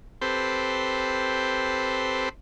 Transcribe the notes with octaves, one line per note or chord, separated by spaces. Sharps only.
C4 G4 A4 B4 C5